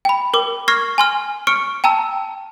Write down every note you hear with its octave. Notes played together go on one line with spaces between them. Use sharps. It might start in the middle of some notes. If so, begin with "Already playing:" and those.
G5 B5
A#4 D6
C#6 F6 G#6 A#6 C7
G#5 C6 F6
C#6 F6 C#7 D7
G5 A5 A#5 E6